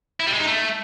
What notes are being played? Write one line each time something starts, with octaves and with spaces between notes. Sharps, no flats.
E4
G3
G#3
D#4
A3